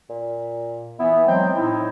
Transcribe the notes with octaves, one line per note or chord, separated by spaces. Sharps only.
A#2
E3 B3 E4
F#3 G#3 C4 G5
A2 D#4 E4